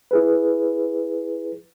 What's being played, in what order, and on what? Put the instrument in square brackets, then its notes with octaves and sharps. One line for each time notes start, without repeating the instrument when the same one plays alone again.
[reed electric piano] E4 G#4 B4